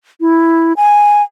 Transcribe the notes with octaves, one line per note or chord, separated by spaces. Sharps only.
E4
G#5